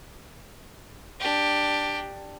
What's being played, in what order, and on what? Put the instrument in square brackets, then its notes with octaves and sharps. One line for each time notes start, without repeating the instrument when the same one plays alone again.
[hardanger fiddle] D4 G4